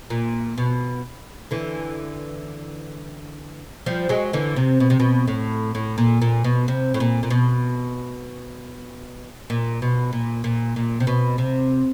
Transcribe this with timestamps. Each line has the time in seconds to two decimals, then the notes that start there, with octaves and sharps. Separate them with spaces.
0.10 A#2
0.58 B2
1.51 D3 E3
3.86 F3 G3
4.09 F#3 G#3
4.33 D3 E3
4.56 C3
4.80 B2
4.90 C3
5.00 B2
5.27 A2
5.75 A2
5.98 A#2
6.21 A#2
6.44 B2
6.68 C3
6.94 A2
7.00 A#2
7.23 A#2
7.30 B2
9.50 A#2
9.82 B2
10.13 A#2
10.44 A#2
10.76 A#2
11.00 C3
11.07 B2
11.38 C3